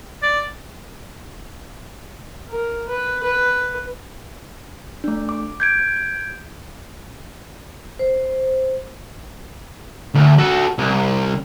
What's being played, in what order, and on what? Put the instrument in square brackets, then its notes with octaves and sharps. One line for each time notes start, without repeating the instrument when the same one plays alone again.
[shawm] D5
[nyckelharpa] A#4
B4
B4
[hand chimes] A3 D4
D6
G6 G#6 D7
[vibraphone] C5
[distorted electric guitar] D2
F#4 A4
C2